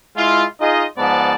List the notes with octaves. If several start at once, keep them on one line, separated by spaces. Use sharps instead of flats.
G#3 E4 F4
D#4 F4 G#4 D#5
G#2 F3 B3 D5 A5